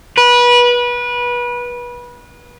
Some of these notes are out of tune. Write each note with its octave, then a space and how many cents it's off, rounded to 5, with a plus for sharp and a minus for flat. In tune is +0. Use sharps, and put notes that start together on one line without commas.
B4 -25